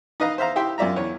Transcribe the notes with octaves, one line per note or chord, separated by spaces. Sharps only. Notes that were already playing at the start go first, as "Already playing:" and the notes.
D#4 B4 D#5 F5 A#5
C5 E5 F5 A#5
E4 G4 E5 G5 C6
F#2 F4 D5 E5 A#5
E2 C#5